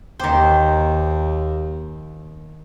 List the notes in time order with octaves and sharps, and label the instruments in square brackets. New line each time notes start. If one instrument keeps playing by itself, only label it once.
[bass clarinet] D#2 [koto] D#3 C5 [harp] G5 D6